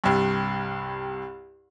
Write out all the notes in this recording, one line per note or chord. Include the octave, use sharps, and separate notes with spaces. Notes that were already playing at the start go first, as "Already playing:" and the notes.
C2 G2